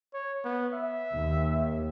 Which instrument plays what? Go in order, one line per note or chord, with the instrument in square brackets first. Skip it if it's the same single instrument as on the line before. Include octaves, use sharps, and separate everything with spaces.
[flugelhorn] C#5
B3
E5
[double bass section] D#2